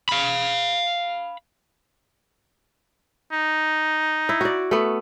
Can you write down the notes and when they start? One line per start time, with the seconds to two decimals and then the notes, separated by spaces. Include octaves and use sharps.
0.09 F5 B5
3.32 D#4
4.29 E4
4.41 F#4 D5
4.71 A3 B3